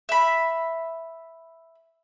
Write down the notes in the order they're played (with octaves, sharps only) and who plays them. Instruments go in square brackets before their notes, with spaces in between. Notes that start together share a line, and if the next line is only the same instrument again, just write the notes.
[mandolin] E5 B5